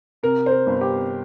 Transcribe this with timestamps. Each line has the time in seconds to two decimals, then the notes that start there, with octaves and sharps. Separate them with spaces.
0.23 C3 A#4
0.46 C5
0.52 A#4
0.67 G1
0.81 G4